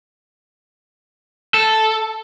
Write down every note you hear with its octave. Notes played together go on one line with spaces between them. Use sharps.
A4